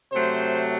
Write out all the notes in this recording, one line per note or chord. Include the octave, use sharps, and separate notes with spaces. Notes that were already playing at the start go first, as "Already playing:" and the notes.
C3 F#3 A3 C5